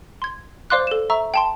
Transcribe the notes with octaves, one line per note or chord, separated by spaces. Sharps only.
C6 G#6
C5 D5 F5 C6 D6 F#6
A4 E7
E5 A#5 C#6 E6
G5 A5 C6